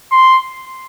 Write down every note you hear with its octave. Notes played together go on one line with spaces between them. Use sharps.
C6